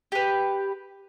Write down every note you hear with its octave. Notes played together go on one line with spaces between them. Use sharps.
G4 B4